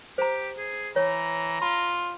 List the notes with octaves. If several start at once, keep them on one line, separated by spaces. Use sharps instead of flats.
G4 C5 A#5
G#4
E3 C#5 A#5
F4 B5